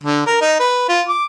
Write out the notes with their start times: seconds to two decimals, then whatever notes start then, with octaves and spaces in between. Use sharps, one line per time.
0.03 D3
0.26 A#4
0.41 D#4
0.59 B4
0.89 F4
1.08 D6